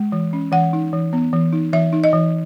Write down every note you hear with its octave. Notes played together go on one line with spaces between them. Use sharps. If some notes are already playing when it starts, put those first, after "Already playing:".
Already playing: G#3
E3
C#4
E3 F#5
D#4
E3
B3
E3
D#4
E3 E5
D#4
D#5
E3